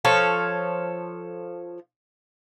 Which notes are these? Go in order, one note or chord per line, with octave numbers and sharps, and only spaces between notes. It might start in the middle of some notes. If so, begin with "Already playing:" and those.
F3 A4 C#5 F5